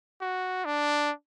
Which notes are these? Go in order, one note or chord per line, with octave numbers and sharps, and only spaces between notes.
F#4
D4